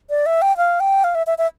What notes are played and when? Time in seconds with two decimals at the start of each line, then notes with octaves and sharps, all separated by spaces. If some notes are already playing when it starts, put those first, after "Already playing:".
0.10 D5
0.26 E5
0.42 G5
0.57 F5
0.80 G5
1.04 F5
1.15 E5
1.27 E5
1.38 E5